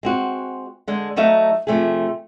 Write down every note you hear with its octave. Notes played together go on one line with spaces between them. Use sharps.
G#3 C4 F#4
D3 G#3
F#3 A3 D#4 E5 F5
C3 F3 A3 G4 G#4